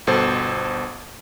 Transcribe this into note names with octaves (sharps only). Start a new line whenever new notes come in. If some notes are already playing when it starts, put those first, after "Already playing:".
G1 B2 A4 C5